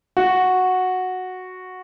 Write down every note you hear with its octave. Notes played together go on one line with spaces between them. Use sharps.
F#4